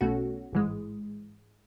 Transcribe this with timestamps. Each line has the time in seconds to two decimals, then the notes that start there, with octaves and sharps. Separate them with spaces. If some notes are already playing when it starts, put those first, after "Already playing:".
0.01 B1 B2 A3 C#4 F#4
0.53 A1 G#2 E3 G#3